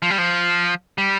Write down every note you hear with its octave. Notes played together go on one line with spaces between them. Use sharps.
F3
G3
F3
G3